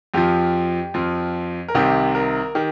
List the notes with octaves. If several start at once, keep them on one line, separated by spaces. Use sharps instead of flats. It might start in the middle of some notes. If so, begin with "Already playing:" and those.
F2 F3 G4
F2 F3
A#4
C2 C3 D#3 G4
A#4
D#3 G4